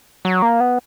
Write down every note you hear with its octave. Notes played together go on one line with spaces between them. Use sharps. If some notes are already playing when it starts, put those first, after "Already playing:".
F#3
A#3
B3